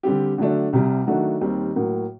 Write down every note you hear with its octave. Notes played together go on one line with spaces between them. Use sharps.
D3 G3 C4 G4
D3 F#3 A3 D4
C2 C3 G3
D#3 F#3 A3 D4 F#4
D#2 D#3 G3 C4
A2 F#3 A#3